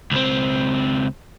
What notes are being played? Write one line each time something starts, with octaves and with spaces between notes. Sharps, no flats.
C#2 C4